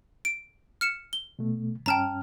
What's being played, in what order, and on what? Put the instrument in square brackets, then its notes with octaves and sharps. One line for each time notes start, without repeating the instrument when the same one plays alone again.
[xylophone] D7
F6 C#7 E7
G7
[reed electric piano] B2 A3
[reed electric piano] G2 C#4 F6 [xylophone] G5 A5 A#5